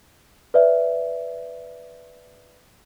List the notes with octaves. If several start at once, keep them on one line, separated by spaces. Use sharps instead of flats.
B4 D5 E5